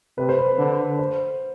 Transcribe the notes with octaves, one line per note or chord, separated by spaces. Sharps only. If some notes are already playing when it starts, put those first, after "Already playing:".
C3 B4
C5
B4
D3
C5